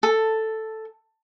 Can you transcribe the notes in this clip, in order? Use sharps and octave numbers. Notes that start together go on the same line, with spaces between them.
A4